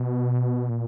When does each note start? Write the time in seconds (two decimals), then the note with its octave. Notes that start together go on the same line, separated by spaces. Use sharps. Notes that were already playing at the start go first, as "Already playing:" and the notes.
Already playing: B2
0.70 A#2